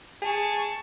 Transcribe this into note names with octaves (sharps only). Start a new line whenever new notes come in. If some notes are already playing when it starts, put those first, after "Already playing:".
G#4 A5 C#6